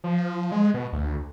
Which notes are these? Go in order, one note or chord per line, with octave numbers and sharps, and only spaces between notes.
F3
G#3
B2
D2